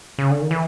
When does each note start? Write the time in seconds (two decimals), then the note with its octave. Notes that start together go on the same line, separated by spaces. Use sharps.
0.19 C#3
0.30 D3
0.41 D#3
0.51 E3